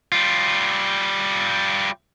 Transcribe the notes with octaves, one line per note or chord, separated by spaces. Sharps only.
G3 F4